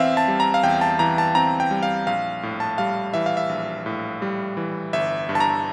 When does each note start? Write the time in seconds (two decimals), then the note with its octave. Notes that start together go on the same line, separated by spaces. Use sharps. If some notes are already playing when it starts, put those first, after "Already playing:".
Already playing: E2 E3 C4 E5 F5
0.17 A5
0.28 G3
0.40 A#5
0.54 F5
0.63 E2 G5
0.81 A5
0.99 E3 A#5
1.18 A5
1.35 C4 A#5
1.60 G5
1.71 G3
1.83 F5
2.07 A#1 F5
2.43 A2
2.60 A5
2.78 G3 F5
3.14 E3 E5
3.26 F5
3.37 E5
3.49 A#1
3.86 A2
4.22 G3
4.57 E3
4.93 G1 E5
5.29 G2
5.35 A5
5.40 A#5